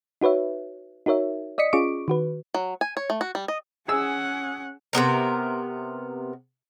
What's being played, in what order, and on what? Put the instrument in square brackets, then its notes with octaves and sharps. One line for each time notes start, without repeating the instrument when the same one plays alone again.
[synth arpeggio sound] D#4 F#4 B4 C#5 E5
D#4 F#4 A#4 C#5 E5
D5 D#5 D#6 B6 C#7
C#4 F4 G#4 C#6 D6 D7
D#3 F#4 B4
[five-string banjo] F#3
G#5
C#5
A3
F#4
G3
D#5
[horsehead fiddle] C#4 F#5 [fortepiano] G#4 E6
[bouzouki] C3 F#3 B3 A#4